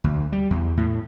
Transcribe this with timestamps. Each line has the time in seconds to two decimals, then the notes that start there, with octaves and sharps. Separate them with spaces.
0.04 D2
0.32 G3
0.50 E2
0.77 A2